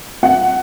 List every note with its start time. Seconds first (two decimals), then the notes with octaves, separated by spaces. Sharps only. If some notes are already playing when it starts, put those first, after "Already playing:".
0.23 F#5